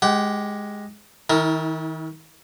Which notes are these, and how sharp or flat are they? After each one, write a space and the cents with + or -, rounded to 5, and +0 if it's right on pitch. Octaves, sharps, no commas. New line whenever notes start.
G#3 +0 G4 +0 F#5 +35
D#3 +35 E4 -35 A#4 -10